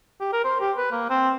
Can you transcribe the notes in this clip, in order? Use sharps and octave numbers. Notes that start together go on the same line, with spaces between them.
G4
A#4
C5
G4
B4
A#3
C4